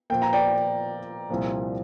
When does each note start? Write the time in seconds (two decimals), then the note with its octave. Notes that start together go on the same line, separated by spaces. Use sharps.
0.10 A#2 F3 A#3 G5
0.22 A#5
0.33 D5 G5
1.30 C2 A#2 F3 A#3